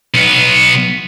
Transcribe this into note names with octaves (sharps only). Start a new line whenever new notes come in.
B1 B3